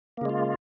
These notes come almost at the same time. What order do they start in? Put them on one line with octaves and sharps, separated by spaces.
A#3 C#3 G#3 F4